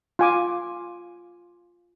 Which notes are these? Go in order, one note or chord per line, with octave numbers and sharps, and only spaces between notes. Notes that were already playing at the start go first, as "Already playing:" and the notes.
F4 G#5 D6